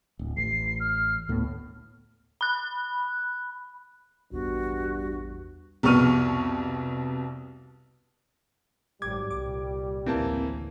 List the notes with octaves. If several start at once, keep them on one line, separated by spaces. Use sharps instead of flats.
D1
A1 C7
F6
D2 A2 B3
B5 F#6
A1 E2 G2 F#4
C2 F2 B2 C#6 F6 D#7
G#1 G#2 F#3 G3 D6 G#6
C2 A#2 D6
A1 D2 C#3 E3 A#3 C4 A5